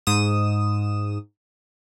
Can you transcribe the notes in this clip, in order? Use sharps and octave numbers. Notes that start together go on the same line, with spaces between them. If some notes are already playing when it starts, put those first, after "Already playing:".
G#2 D#6 E7